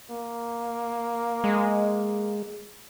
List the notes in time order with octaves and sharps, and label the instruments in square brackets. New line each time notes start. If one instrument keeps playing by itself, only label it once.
[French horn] A#3
[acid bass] G#3